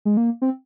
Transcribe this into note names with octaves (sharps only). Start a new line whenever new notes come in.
G#3
A#3
C4